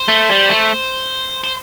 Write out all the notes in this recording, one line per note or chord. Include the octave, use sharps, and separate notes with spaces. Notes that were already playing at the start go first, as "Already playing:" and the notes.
Already playing: C5
A3
G3
A3
C5